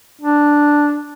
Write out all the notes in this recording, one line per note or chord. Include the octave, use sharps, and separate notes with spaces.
D4